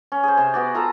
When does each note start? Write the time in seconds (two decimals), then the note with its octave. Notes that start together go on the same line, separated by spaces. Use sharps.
0.12 C#4
0.23 G#4 C5
0.37 C3 C6
0.54 B3 F#4 D5
0.75 F4 A4 A#5